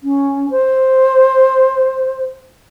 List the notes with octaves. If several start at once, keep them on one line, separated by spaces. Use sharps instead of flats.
C#4
C5